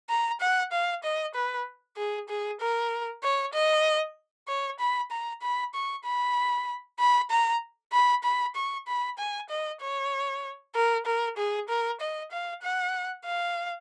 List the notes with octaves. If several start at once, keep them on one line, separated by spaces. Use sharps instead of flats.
A#5
F#5
F5
D#5
B4
G#4
G#4
A#4
C#5
D#5
C#5
B5
A#5
B5
C#6
B5
B5
A#5
B5
B5
C#6
B5
G#5
D#5
C#5
A#4
A#4
G#4
A#4
D#5
F5
F#5
F5